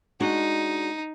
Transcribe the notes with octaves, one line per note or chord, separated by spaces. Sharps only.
G#3 D4 D#4 F#4